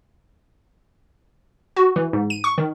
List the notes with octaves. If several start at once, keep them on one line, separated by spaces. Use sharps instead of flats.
F#4
E3
G#2
D#7
C#6
D#3